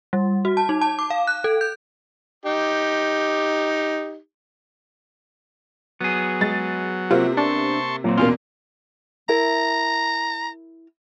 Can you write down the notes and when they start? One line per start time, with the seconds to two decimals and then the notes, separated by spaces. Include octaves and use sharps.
0.13 G3
0.45 F#4
0.57 A5
0.69 D#4
0.81 A5
0.99 D6
1.10 F5
1.27 F#6
1.44 A4
1.61 G6
2.45 D#4 G4
6.01 F#3 B3 G#4
6.41 G#3 A6
7.10 C3 A#3 C4 F4
7.37 D4 A5 C6 C#6
8.04 A#2 F#3 A#3 C4
8.17 E2 B2 A#3 C#4 F4 C6
9.29 E4 A#4 A#5